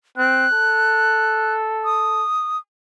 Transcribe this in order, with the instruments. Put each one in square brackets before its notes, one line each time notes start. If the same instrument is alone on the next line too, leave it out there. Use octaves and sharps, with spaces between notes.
[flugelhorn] C4 [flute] F#6
[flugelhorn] A4
[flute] D#6